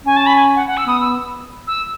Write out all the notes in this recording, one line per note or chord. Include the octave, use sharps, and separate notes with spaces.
C#4 G#5
A5
B5
G#5
F#5
F#5
E6
B3 D#6
E6
E6